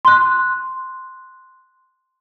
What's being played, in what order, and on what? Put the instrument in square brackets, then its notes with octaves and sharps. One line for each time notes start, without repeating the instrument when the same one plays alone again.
[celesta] C6 F#6